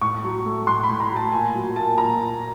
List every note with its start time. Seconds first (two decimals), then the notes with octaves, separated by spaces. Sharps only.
0.01 A2 C#6
0.24 F#3
0.46 A3
0.67 A2 C6
0.83 B5
0.89 A2
1.00 A#5
1.10 F#3
1.16 A5
1.32 A#2 G#5
1.55 F#3
1.76 A#3 A5
1.98 A#2 A#5
2.19 A#2